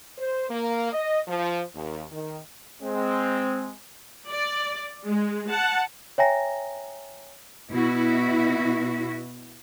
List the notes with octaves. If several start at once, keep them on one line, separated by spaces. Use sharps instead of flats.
C5
A#3
D#5
F3
D#2
D#3
G#3 C4
D5
G#3
F#5 A5
C#5 E5 G5 G#5 A#5 A#6
B2 E4 F#4